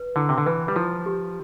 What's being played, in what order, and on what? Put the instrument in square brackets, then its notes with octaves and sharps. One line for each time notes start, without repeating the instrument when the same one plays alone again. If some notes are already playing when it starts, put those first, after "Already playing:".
Already playing: [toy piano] B4
[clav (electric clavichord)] D3 [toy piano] E4
[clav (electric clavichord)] C3
D3
[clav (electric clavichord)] E3 [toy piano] B4
[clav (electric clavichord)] G3
[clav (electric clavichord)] F3 [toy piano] E4
[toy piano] G4